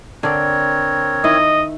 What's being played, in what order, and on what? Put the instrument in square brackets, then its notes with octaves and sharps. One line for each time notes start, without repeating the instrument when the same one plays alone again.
[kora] D3 D5 [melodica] C4 A#4 C#5
[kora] D#3 E4 [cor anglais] D#5